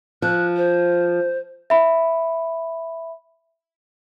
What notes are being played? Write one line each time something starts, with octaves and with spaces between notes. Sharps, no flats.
F3 F#6
C5
E5 B5